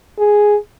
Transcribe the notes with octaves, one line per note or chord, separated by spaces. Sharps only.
G#4